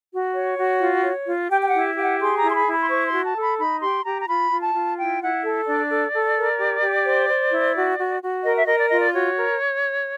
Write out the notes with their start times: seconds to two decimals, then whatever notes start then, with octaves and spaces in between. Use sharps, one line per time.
0.12 F#4
0.35 C#5
0.58 F#4
0.81 F4
1.04 C#5
1.27 F4
1.50 G4 G5
1.62 G5
1.68 F#5
1.74 E4
1.97 G4 F5
2.02 F#5
2.20 G#4 C6
2.37 A#5
2.43 E4
2.50 C6
2.55 B5
2.66 E4
2.72 B5
2.81 C6
2.89 C5 C#6
3.06 C6
3.12 F#4
3.24 A5
3.35 A4
3.41 B5
3.58 D#4 B5
3.82 G4 C6
4.04 G4 A#5
4.21 A#5
4.27 F4 B5
4.51 F4
4.62 A5
4.74 F4
4.97 E4 G5
5.20 E4 F#5
5.43 A4
5.66 D4 D5
5.89 A4
6.12 A4
6.36 A#4
6.59 G4
6.82 G4
7.05 C5
7.28 C5
7.52 E4
7.75 F#4
7.97 F#4
8.21 F#4
8.44 A#4 D#5
8.56 E5
8.67 A#4 D#5
8.79 D5
8.90 F4 D#5
9.01 D5
9.13 F#4 C#5
9.36 A#4